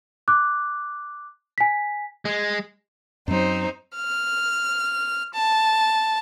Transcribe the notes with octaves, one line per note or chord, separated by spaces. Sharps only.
D6 F#6
G#5 B6
G#3
F#2 F#3 C4 D#4 C5
F6
A5